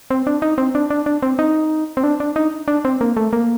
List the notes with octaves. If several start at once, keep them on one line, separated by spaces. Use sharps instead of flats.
C4
D4
D#4
C4
D4
D4
D4
C4
D#4
C4
D4
D4
D#4
D4
C4
A#3
A3
A#3